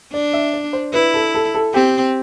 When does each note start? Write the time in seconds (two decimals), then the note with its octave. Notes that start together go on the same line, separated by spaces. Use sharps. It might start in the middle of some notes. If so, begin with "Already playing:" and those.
0.13 D4 D5
0.33 E5
0.53 D5
0.73 C5
0.93 E4 B4
1.14 A4
1.35 A4
1.55 A4
1.74 C4 G4